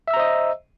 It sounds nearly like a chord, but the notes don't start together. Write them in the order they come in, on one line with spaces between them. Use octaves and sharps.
E5 E6 A#5 C5 D#5